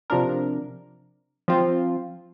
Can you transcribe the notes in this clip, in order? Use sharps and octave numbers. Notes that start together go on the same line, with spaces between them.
C3 F3 D4 A#4
F3 C4 F4